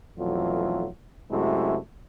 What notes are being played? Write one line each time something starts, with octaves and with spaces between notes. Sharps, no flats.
B1 F2 E3 F#3 A3 F4
F#2 C3 G#3 A3 E4 F#4